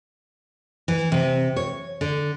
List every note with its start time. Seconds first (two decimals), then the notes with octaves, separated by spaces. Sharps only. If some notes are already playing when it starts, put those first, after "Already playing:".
0.88 E3
1.12 C3
1.56 C#5
2.01 D3